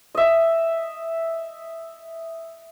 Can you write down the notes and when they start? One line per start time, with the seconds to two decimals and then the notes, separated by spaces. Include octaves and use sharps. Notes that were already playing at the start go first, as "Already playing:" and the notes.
0.15 D#5 E5